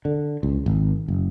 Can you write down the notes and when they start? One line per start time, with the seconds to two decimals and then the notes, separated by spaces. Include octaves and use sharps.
0.05 D3
0.43 C#2
0.66 G#1
1.08 F#1